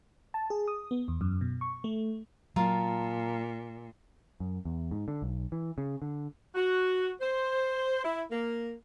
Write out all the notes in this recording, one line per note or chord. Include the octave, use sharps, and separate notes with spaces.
A5
G#4
D#6
B3
E2
F#2
B2
C#6
A3
A#2 F#3 F4 A#4 A5
F#2
E2
G#2
D3
B1
E3
C#3
D3
F#4
C5
E4
A#3